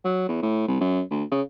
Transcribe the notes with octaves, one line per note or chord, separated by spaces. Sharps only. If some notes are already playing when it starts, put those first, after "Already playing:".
F#3
E2
A2
C2
F#2
D2
C#3